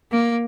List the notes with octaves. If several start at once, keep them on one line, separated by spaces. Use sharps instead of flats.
A#3